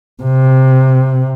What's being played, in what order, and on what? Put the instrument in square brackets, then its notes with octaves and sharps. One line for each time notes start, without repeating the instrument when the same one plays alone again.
[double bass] C3